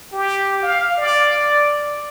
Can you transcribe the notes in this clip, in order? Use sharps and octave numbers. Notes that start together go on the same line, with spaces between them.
G4
F5
D5